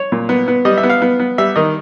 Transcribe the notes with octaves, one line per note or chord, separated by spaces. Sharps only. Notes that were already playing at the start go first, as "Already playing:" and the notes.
Already playing: C#5
A#2
B3
B3
G3 D#5
E5
B3
F5
B3
B3
G3 E5
D#3 D#5